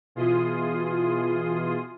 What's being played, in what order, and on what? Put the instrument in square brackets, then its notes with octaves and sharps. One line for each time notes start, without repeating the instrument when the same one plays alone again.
[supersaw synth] B2 E3 F4 G#4 C6 D#6